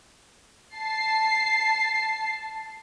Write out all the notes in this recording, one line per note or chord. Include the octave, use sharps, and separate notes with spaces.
A5 C7